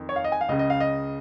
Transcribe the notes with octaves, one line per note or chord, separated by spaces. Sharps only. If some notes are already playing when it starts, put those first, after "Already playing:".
Already playing: F2 D#3
C#5
F5
D#5
G#5
F5
C#2 C#3 D#5
D#5
F5
D#5